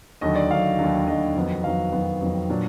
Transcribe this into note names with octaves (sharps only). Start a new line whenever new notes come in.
D#2 D3 F#3 D#5
D5
D#2 D3 F#3 F5
D#2 D3 F#3
D#2 D3 F#3 D#5
F2 D#3 F#3 B3
F2 D#3 F#3 B3 F5
F2 D#3 F#3 B3
F2 D#3 F#3 B3
A#2 F#3 D4